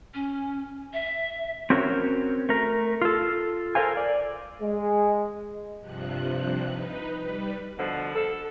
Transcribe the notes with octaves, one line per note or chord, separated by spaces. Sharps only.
C#4
E5
C4 C#4 F#4 A#4 C5 C#5
A3 A#4
F4 A4
A4 A#4 C5 F5 G#5
D5
G#3
G2 C3 F3 F#6
D#4 B4
G3 B4
B2 D3 F3
A4